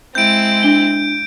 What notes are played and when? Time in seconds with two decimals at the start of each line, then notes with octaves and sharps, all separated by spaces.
0.15 G#3 C4 E4 G6 D7
0.63 D4 G7